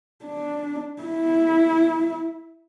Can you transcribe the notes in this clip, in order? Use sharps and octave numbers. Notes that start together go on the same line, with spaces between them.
D4
E4